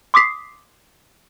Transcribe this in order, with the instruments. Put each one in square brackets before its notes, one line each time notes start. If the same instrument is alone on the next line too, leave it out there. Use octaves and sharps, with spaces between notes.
[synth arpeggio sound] C6 D6 D#6 B6 C7